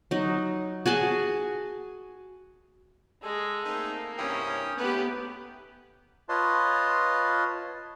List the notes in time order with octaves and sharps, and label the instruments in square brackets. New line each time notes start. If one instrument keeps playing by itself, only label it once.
[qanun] F#3 D#4
F#4 G#4 G#5 A5
[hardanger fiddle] G#3 [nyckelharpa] G#4 [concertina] A4
[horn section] A3 C4 D#4 [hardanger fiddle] A#3
[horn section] G2 C3 E4 [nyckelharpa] C#4 [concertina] G5 D#6
[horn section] G#2 A3 B4 [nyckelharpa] B3 G4
[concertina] F4 B4 C#5 D#5 A5 C6